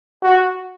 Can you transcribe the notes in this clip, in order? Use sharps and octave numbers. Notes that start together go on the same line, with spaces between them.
F#4